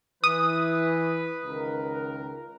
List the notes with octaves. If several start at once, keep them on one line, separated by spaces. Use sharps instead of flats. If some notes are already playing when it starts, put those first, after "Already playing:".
E3 B4 D#6
C#2 D#3 A#4